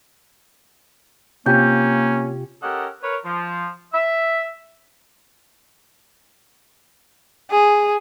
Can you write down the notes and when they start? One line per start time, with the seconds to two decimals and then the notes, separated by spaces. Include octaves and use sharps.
1.46 C3 A#3 C#4 F4 G4 G6
2.62 C#4 G4 A4 A#4 D#5 F#5
3.02 A#4 B4 C#5
3.25 F3
3.93 E5
7.51 G#4